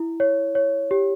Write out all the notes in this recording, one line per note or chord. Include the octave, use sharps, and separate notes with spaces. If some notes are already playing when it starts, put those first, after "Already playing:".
Already playing: E4
C#5
C#5
G4